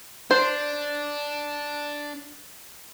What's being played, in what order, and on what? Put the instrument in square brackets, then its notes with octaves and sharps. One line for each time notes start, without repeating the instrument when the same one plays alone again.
[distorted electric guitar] D4 [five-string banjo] C5